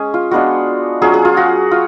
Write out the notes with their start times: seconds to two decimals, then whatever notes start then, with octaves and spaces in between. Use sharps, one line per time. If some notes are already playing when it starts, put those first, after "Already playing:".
Already playing: G#3 C#4 G#4
0.14 F4
0.31 G#3 B3 D4 F4 F#4
1.02 F#3 C#4 F4 G#4
1.14 G#4
1.25 F4
1.37 F#4
1.71 F4